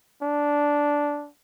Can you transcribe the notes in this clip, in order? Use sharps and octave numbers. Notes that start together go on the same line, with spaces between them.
D4